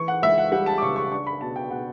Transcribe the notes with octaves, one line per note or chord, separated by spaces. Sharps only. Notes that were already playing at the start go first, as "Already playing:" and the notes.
Already playing: E3 C#6
F#5
C#2 E5
F#5
G3 F#5
A5
D6
C#3 C#6
C#6
D4 C#6
B5
B2 A5
G5
B2 F#5